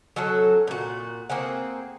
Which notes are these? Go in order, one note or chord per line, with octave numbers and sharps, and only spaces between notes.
F#3 C#4 F#4 A4
A#2 F#4
A#3 C4 G#4 F#5